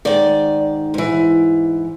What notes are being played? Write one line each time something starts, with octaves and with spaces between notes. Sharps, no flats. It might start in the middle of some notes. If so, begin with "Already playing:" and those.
G#2 D#3 D5
G#2 E3